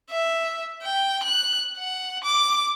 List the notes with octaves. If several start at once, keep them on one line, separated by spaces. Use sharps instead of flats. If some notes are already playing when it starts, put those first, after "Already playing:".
E5
G5
F#6
F#5
D6